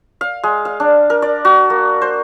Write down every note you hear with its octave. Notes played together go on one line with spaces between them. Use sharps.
F5
G#3
F5
D4
A#4
D5
F#4
A#3
C5